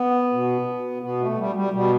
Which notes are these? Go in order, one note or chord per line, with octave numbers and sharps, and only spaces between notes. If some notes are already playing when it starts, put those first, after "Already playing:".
Already playing: B3
B2
B2 B3
A3
G3
G3
B2 G3